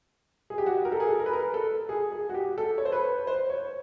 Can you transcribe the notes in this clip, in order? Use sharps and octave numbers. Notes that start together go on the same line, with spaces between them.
G#4
G4
F#4
G4
A#4
A4
G#4
A4
A#4
B4
A#4
A4
G#4
G#4
F#4
G4
A4
C#5
C5
B4
C5
C#5